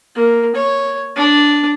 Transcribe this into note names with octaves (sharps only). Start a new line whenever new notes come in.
A#3
C#5
D4